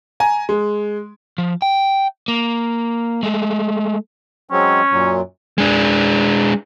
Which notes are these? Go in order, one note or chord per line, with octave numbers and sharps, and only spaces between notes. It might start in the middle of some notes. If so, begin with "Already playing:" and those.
G#5 A#5
G#3
F3
G5
A#3
G#3 A3
F#3 G#3 C4 C#4
F#2 A#2 F#3
G#3 D4